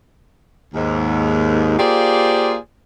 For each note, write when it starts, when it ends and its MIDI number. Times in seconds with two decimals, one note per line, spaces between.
0.75 1.76 39
0.75 1.76 44
1.78 2.55 58
1.78 2.55 65
1.78 2.55 67
1.78 2.55 68
1.78 2.55 72
1.78 2.55 74